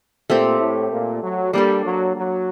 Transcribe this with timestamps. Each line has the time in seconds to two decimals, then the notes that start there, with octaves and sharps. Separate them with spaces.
0.30 A#2 A3 C4 G4
0.60 A2
0.92 A#2
1.23 F#3
1.53 G3 A#3 D4 A4
1.85 F#3
2.16 F#3